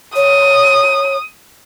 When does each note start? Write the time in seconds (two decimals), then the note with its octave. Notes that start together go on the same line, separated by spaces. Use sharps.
0.16 C#5 D#6